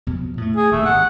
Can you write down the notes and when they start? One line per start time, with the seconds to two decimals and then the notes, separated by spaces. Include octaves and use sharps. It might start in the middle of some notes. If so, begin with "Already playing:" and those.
0.07 F2 B2
0.37 A2 A3
0.56 G#4
0.71 D#1 D#2 C3 A3
0.85 G#1 C3 F#5